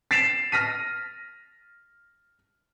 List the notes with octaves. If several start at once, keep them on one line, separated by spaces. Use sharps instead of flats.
A6 B6 C7 D7 E7 F7
F6 A#6 B6 D#7